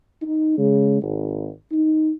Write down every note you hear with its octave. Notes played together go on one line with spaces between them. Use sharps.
D#4
C#3 G#3
G#1
D#4